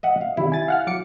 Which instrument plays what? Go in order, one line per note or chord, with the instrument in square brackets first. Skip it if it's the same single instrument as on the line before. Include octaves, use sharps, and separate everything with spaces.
[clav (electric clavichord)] D#5 E5 F#5
F5
[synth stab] C3 D#3 G3 [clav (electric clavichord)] E4
[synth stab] G#5 A6
F5 F#5 F6
F#3 D6 C#7